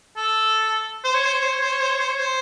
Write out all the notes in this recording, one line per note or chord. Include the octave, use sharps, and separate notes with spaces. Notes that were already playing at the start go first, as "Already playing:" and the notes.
A4
C5
C#5
C5
C#5
C5
C#5
C5
C#5
C5
C#5
C5
C#5
C5